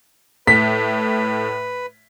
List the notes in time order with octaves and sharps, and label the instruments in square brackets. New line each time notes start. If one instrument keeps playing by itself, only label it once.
[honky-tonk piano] A2 [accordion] B4 [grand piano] B6